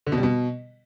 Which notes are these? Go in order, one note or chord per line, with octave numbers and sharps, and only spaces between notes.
D3
B2
G3
B2